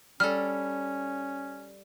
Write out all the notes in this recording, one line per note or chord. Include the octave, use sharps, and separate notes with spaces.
G3 C#4 A4 F6